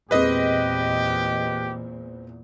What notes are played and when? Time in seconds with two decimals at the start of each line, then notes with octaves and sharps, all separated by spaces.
0.11 E2 A#2 G#3 C4 G4 B4 D#5 D#6